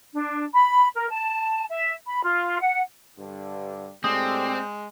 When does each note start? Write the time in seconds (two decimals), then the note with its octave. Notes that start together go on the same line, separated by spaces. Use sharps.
0.12 D4
0.53 B5
0.94 A#4
1.10 A5
1.69 E5
2.07 B5
2.23 F4
2.61 F#5
3.18 G2 D3
4.04 A2 G#3 C4 D4 G4 D#6